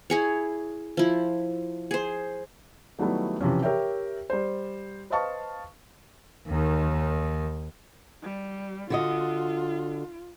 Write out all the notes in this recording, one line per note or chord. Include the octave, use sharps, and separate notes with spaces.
E4 G#4 C#5
F3 E4
G#4 C5
D#3 F#3 G3 A3 B3 E4
C3 E3 F3 C#4
G4 A#4 C#5 E5 G5
G3 C5
B4 C5 D#5 F5 A5 C#6
D#2 D#3
G3
D3 F4 F#4 D#5